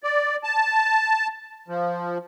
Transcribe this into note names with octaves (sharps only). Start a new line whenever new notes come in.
D5
A5
F3